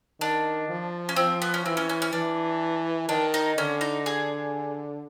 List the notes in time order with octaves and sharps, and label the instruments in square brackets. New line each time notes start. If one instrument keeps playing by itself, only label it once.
[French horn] D#3 [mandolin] D4
[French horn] F3
[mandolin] C#4
[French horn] F3 [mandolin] C4
[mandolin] B3
C#4
[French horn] E3 [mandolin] C4
[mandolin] C#4
C#4
C#4
[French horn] E3 [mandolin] D4
[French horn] D#3 [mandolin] D4
[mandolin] D#4
[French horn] D3 [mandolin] C#4
[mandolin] D#4
G#4